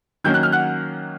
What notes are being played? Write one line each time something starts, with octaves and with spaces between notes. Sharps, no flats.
D#3 F#3 A#3 C#4 G6
F#6
F6
F#5 F#6